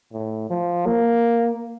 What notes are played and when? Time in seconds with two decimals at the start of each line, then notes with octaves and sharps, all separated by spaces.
0.13 A2
0.50 F3
0.86 A#3